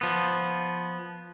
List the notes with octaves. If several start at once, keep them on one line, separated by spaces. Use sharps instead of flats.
F3 B3